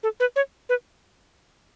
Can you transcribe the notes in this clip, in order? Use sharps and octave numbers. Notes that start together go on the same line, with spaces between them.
A4
B4
C#5
B4